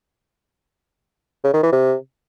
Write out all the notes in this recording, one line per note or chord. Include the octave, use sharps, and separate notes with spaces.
C#3
D#3
E3
C3